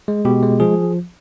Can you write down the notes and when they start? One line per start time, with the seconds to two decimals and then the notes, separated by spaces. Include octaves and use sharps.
0.08 G#3
0.25 B2 G4
0.43 G#3
0.60 F3 G#4